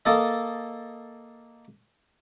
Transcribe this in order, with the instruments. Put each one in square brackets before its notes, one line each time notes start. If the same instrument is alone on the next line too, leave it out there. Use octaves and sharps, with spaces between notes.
[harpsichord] A#3 A4 D#5